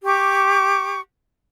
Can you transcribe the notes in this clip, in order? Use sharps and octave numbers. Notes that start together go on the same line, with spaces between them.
G4 C#6 D6